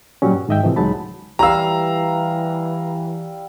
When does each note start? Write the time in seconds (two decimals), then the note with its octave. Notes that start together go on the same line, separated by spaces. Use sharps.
0.22 A#2 F#3 G3 C#4
0.33 G2
0.49 G#2 D#3 D#5 E5 G5
0.63 A2 C3 E3 F3
0.76 C#2 F#3 G#3 D#4 A5 B5
1.39 E3 G3 F5 A#5 E6